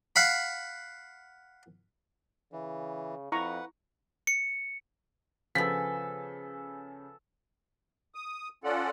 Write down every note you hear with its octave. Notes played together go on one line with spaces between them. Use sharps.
F5 F#5 B5
C#3 E3
F2 E4 B4 F#5 A#5 C#6
C#7
C#3 F3 B3 A4 G#5 B6
D#6
C#4 F4 A4 D5 F#5